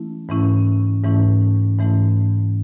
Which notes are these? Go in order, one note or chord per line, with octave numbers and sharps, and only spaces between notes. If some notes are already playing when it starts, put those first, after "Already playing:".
Already playing: E3 A3 C#4 E4
G#2 E3 A3 C#4 E4
G#2 E3 A3 C#4 E4
G#2 E3 A3 C#4 E4